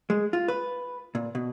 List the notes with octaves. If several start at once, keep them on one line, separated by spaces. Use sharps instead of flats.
G#3
F4
B4
A#2
B2